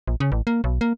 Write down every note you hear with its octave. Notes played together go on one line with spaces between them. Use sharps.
A#1
C#3
A1
A#3
B1
A#3